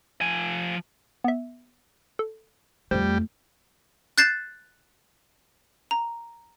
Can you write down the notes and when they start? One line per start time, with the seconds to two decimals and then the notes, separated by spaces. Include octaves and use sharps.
0.21 F3 G#5
1.24 B3 E5
2.19 A4
2.91 F2 G3 A3 C5
4.18 F#6 G6 A6 C7 E7
5.91 A#5